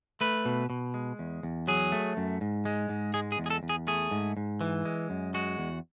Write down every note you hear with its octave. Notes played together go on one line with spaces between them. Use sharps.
A3 B4
B2
B2
G#3
E2
E2
F#3 G#4
A3
F#2
G#2
G#3
G#2
G#3 G#4
G#4
E2
G#4
A4
E2
G#4
A3 G#4
G#2
G#2
E3
G#3
F#2
G#3 F#4
E2